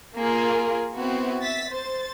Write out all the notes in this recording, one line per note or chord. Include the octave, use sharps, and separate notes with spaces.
A#3 F4 G#4 A#4
B3 C4 E4 F#4
E5 A6 B6
C5 A6